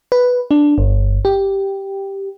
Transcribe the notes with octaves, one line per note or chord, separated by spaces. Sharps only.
B4
D4
G1
G4